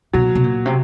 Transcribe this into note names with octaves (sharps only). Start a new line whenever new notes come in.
B2 F#3
B2
A#2
C3